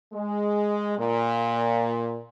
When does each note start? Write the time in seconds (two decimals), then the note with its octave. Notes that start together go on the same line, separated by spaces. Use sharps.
0.13 G#3
0.98 A#2